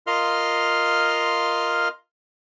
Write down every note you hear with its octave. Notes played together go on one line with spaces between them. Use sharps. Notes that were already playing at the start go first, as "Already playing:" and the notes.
F4 A#4 D#5 F5 C6 F6